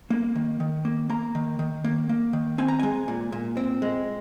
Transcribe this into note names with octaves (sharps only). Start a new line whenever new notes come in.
A#3
D#3
D#3
A#3
A#3 A#5
D#3
D#3
A#3
A#3
D#3
C4 G#5
A#5
G#3 G#5
A#2
A#2
C4
G#3